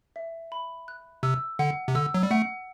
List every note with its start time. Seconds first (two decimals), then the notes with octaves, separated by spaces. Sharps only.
0.16 E5
0.52 B5
0.88 F#6
1.23 C3 E6
1.59 D3 F#5
1.88 C3
1.95 D3 E6
2.14 F#3
2.23 G3
2.31 A3 F#5